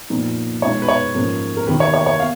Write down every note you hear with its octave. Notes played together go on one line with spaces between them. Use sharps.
A#2 F3 B3 D#4
B2 G#3 B3 D#4 C#5
B4
C#5
G#2 F3 A#3 C#4
A#4
D#2 D#3 A#3 B4
C#5
C#5
C#5
B3 F5